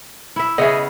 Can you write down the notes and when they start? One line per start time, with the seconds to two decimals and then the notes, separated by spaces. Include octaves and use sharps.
0.36 E4 E5
0.58 C#3 B3 G#4 D#5 E5